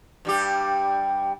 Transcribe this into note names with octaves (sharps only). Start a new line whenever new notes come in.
G2 G3 G4